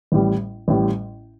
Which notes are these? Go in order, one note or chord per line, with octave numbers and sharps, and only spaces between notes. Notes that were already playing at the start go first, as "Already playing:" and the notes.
A1 A2 G3
A1 A2 G3